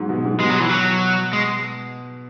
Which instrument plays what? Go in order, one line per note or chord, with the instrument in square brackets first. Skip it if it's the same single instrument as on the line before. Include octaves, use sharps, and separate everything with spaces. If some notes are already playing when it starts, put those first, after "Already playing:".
Already playing: [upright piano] G#2 F#3
B2
G#2
[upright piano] B2 [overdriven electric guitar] G#3
[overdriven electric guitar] F#3
E3
F#3
G#3